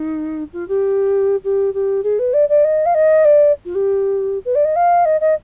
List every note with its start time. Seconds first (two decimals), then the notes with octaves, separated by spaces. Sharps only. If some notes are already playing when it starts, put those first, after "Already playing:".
Already playing: D#4
0.53 F4
0.68 G4
1.44 G4
1.74 G4
2.03 G#4
2.19 B4
2.33 D5
2.49 D5
2.64 D#5
2.85 F5
2.94 D#5
3.25 D5
3.65 F4
3.75 G4
4.45 B4
4.55 D5
4.64 D#5
4.76 F5
5.05 D#5
5.20 D#5